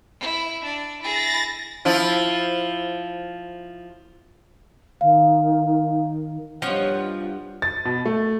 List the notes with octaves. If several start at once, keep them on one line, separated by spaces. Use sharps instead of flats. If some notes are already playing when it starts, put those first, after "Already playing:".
E4
D4
E4 G#4 A6 A#6
F3 E4 F4
D#3 F5
G2 F3 C#5 D#5 F#5
A6
B2
A3